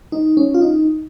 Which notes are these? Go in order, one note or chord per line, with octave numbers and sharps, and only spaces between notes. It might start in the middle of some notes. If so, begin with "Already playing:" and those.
D#4
C#4
F4
D#4